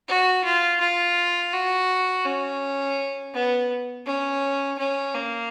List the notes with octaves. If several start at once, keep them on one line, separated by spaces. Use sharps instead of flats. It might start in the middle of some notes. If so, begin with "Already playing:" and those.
F#4
F4
F4
F#4
C#4
B3
C#4
C#4
A#3